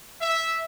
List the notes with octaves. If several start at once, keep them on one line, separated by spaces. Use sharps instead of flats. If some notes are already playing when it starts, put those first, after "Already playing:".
E5